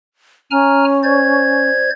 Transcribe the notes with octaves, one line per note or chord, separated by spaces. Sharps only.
C#4 G#5 A#5 F6
C5 D5 G#6